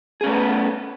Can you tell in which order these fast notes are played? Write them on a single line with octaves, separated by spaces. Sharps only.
G#4 C#4 A3 B4 B3